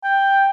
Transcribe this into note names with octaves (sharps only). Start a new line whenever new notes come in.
G5